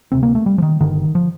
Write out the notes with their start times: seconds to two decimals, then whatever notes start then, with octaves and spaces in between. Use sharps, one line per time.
0.12 D2 C3 C4
0.23 A#3
0.35 A3
0.46 G3
0.58 F3
0.62 D#3
0.80 G1 G2 D3 D#3
1.15 F3